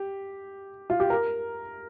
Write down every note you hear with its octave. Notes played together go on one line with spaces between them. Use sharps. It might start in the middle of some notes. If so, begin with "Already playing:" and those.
Already playing: G4
F4
G4
A#4